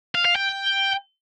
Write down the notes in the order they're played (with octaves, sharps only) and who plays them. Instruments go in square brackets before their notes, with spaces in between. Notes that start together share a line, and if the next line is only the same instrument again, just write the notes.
[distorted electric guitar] F5
F5
G5